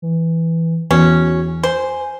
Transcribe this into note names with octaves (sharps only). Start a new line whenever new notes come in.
E3
E2 C#4 F#4
C5 G#5